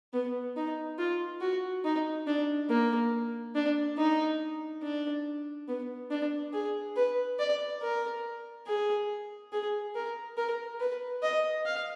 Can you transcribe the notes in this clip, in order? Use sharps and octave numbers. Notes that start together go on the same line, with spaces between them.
B3
D#4
F4
F#4
D#4
D4
A#3
D4
D#4
D4
B3
D4
G#4
B4
D5
A#4
G#4
G#4
A#4
A#4
B4
D#5
F5